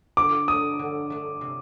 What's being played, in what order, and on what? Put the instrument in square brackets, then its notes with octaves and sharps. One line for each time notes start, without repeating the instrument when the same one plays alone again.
[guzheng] D3 [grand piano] D6
[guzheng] A3 D4 [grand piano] D#6
[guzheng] D3
A3 D4
C3